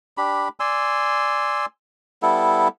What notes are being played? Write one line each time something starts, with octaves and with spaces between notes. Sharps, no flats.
D4 G4 B5
D5 G#5 C6 E6
G3 B3 E4 A4